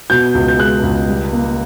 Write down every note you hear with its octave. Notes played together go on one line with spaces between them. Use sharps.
B2 G6
C#2
G6
G#3 F#6
C#2
G3
A#3